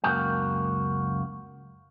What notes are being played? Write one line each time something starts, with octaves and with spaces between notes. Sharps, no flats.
C#2 F#2 A#3 F#4 G5